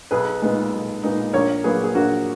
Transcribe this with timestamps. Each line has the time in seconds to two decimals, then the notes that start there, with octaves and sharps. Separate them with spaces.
0.11 B1 G#4 B4
0.42 A#2 G#3 B3 D#4
0.73 B1
1.03 A#2 G#3 B3 D#4
1.33 A#1 A#4 C#5
1.64 A#2 F#3 A#3 G#4 B4
1.84 G#4
1.95 A#1 F#4 A#4